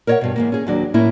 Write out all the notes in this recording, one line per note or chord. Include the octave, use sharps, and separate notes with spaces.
A#4 C5 C#5 D#5 E5 F#5
G2 B2
G#2 E3 A#3
C#4 G#4
D#2 F#3 D4
A2 A#3 C#4 E4